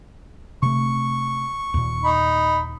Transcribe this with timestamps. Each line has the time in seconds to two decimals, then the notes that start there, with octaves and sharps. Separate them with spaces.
0.62 C3 A3 C#6
1.74 D#2 A#2
2.04 D#4 B5